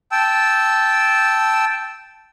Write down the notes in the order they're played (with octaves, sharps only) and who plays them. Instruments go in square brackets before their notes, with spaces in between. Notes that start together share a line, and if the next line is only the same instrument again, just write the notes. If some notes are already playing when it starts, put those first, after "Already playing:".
[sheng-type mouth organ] G5 A5 E6